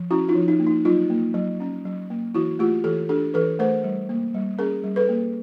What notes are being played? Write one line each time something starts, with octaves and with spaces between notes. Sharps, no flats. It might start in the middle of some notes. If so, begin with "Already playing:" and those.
Already playing: F3
C#4 E4 F#4
D#4 F4
F3
D#4
A#3
D#4
F#3 D#4 F4
A#3
F#3
C#4
F#3
A#3
E3 E4 F#4
A3 F4 G4
E3 G4 A4
D4 G4 A4
E3 A4 B4
A3 A#4 C5
G3
A#3
G3
C#4 G#4 A#4
G3
A4 B4
A#3